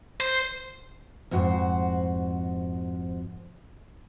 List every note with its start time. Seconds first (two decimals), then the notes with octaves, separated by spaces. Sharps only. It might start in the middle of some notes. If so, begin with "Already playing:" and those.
0.20 C5
1.31 F2 G#2 F#4 C5